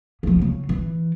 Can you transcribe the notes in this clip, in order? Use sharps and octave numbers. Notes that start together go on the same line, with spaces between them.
C#3 F3
C#3
E3